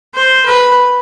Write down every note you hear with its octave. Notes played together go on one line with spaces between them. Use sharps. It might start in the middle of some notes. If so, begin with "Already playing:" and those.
C5
B4